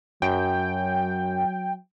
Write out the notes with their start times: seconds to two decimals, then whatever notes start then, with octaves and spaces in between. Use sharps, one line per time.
0.22 F#2 F#3 G5